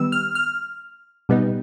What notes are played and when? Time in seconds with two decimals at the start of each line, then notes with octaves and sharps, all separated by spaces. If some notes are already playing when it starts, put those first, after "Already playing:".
Already playing: D#3 G3 B3 E6
0.12 F6
0.35 F6
1.29 B2 G3 B3 D#4